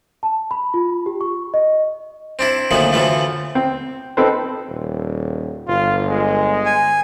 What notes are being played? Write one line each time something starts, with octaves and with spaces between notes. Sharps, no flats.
A5
B5
F4
G4
C#6
D#5
C4 D4 E4
D2 A#2 D#3 F3 F#3 A3
D2 A2 E3 F3 A3
C4
C4 D#4 A4 B4 C5
D#1
G1 F4
G#3
G#5